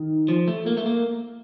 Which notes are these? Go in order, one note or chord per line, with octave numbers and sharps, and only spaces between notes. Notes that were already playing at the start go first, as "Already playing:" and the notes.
Already playing: D#3
F3
A3
A#3
A3
A#3